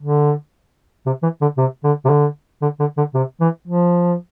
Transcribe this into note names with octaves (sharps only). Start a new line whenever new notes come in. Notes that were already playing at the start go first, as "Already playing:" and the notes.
D3
C3
E3
D3
C3
D3
C3
D3
D3
D3
D3
C3
E3
F3